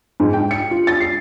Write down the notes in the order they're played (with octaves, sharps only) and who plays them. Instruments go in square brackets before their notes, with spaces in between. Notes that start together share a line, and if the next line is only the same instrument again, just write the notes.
[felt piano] G#2
G5
C#7
F4
A6
C7